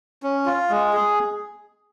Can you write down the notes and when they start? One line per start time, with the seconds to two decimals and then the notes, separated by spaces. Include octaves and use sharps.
0.23 C#4
0.46 F4
0.70 G#3
0.93 G#4